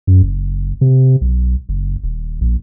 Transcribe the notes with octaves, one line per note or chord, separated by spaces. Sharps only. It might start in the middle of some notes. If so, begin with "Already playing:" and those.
F#2
F#1
C3
B1
F#1
D#1
A#1